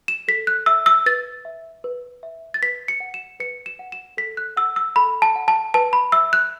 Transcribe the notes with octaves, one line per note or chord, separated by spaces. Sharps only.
E7
A4 B6
F#6
E5 E6
E6
B4 A6
E5
B4
E5
A6
B4 B6
C#7
F#5
E7
B4 C#7
E7
F#5
E7
A4 B6
F#6
F#5 E6
E6
A4 B5
A5
F#5
A5
B4 A5
B5
E5 E6
F#6